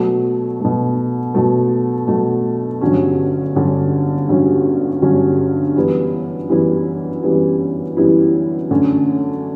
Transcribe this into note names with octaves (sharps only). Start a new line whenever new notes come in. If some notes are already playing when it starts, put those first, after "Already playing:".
Already playing: B2 F#3 A3
B2 F#3 A3
B2 F#3 A3
B2 F#3 A3
G1 G2 D3 F#3 C#4
G1 G2 D3 F#3 C#4
G1 G2 D3 F#3 C#4
G1 G2 D3 F#3 C#4
F#2 E3 G3 B3 E4
F#2 E3 G3 B3 E4
F#2 E3 G3 B3 E4
F#2 E3 G3 B3 E4
F#2 D3 A3 C#4